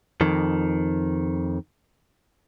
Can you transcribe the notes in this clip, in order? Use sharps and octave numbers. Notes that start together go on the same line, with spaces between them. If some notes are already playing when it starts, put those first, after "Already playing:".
F2 D#3